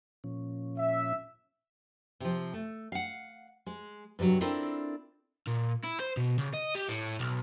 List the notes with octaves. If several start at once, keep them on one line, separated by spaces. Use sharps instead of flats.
A#2 F3 C#4
E5
C3 F3
A3
F5 F#5
G#3
G2 C3 F3 F#3
C4 D4 E4 F4 A4 A#4
A#2
E4
C5
B2
C#3
D#5
G4
A2
B1